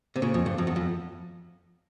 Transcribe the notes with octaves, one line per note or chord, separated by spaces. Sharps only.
C3
A#2 C#3
F2
G2
F2
E2
F2